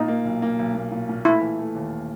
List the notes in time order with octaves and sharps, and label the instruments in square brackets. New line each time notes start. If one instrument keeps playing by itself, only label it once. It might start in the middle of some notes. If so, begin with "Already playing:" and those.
Already playing: [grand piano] A#2 [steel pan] D#4
[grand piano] A#3
B1
A#3
B1
A#3
A#2
A#2
[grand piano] A3 [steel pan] E4
[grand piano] E3
A3
D#2